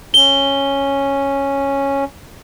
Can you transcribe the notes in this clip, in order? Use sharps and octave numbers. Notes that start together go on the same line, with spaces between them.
C#4 G7